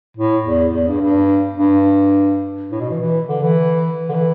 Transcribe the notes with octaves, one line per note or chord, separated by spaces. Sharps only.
A2
E2
E2
G2
G2
G2
A2
B2
E3
E3
D3
E3
D3
E3